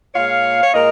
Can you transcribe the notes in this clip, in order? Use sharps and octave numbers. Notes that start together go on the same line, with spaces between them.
A#2 G#3 C#5 F5
C#5
A#2 G#3 A#4 D#5